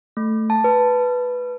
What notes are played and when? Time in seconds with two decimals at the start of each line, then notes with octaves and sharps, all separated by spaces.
0.17 A3
0.50 A5
0.64 B4